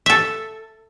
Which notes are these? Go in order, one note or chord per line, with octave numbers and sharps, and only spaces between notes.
A4 E5